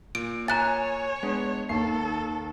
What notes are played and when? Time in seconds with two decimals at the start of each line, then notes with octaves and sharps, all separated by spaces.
0.15 A#2 D7
0.48 C#5 G#5 A#5 F#6 A6
1.23 G#3 B3 D4
1.69 D#2 A4 C7